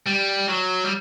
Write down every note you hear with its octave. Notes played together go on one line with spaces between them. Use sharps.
G3
F#3
G3